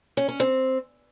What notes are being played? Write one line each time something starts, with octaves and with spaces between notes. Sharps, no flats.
C#4
C#4
C4